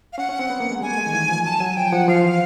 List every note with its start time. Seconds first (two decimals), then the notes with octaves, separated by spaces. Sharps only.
0.13 F5
0.18 C#4 F#5
0.29 C#4
0.39 C4
0.50 B3
0.60 A#3
0.71 G#3
0.81 G3 G#5
0.92 A3
0.97 G#3
1.06 D#3
1.13 E3
1.29 F3
1.45 F#3 A5
1.60 F#3 G#5
1.77 F3 G5
1.92 F3 F#5
2.08 F3 F5
2.24 E3